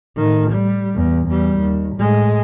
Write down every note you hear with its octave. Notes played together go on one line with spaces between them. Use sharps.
A2 D#3
G3
E2
E2 G3
D#2
A2 G#3